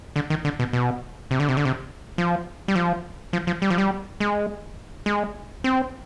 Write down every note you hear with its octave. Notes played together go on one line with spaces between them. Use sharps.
D3
D#3
D3
B2
B2
C3
D3
C3
D3
C3
F3
G3
F3
F3
F3
G3
F3
G3
G#3
G#3
C4